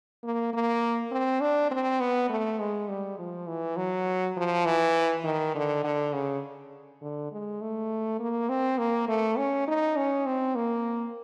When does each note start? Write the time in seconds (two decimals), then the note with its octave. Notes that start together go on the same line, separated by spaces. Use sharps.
0.24 A#3
0.54 A#3
1.11 C4
1.41 D4
1.71 C4
2.00 B3
2.30 A3
2.60 G#3
2.89 G3
3.19 F3
3.48 E3
3.77 F#3
4.37 F3
4.66 E3
5.24 D#3
5.55 D3
5.84 D3
6.14 C#3
7.02 D3
7.32 G#3
7.61 A3
8.19 A#3
8.49 C4
8.78 A#3
9.08 A3
9.38 C#4
9.68 D#4
9.97 C#4
10.26 C4
10.56 A#3